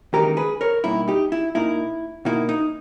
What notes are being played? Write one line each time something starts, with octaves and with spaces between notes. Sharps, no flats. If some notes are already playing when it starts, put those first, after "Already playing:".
D#2 C#3 E3 G#3 D#4 G4 A#4
G#4 B4
A#4 C#5
B2 G3 A#3 D#4 E4
D#4 G4
E4
A#2 A#3 D#4 E4
B2 A#3 D#4 E4
D#4